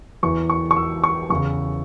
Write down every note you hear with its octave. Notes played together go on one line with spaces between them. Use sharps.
E2 E3 C#6
C#6
C#6
E6
C#6
E2 C#3 E3 C#6